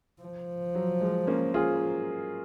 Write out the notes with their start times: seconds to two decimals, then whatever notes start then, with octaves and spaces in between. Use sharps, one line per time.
0.21 F3
0.75 F#3
1.01 G#3
1.27 A#3 C#4
1.54 F4 G#4